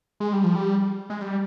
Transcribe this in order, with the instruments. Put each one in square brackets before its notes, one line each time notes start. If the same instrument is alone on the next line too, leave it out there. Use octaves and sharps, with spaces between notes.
[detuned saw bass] G#3
G3
F3
G3
G#3
G3